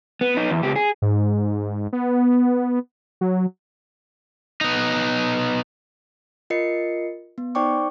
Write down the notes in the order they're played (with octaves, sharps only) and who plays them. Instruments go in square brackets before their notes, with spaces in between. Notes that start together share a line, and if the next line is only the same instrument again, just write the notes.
[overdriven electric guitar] B3
B3 D#4
E2
C#2 G4
G#4
[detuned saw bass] G#2
B3
F#3
[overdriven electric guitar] B3 D#4
[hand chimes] F4 A#4 D#5 C7 C#7
B3
D#4 C5 D5 G5 C#6 D6